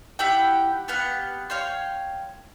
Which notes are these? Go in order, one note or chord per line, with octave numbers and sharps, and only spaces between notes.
E4 G4 F#5 G5
B3 G4 F5 F#5
C#5 F5 G5 C6